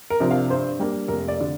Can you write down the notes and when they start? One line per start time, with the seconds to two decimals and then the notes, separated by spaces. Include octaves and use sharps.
0.10 A#4
0.20 C3 F3 D4
0.31 F5
0.50 G2 C5
0.79 G3 A#3 D4
1.08 F1 A#4
1.28 D5
1.41 D3